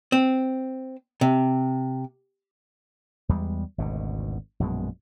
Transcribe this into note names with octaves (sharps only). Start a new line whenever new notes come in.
C4
C3
E2 G3 G#3
G#1 D2 B2
A#1 F#2 B2 G#3